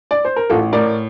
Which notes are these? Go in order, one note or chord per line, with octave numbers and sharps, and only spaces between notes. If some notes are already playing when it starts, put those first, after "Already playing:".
D5
C5
A#4
A1 F4 A4
A2 A#4 D5